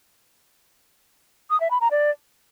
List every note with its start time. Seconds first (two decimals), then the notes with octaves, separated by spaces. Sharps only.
1.50 D#6
1.60 E5
1.71 B5
1.81 A#5
1.91 D5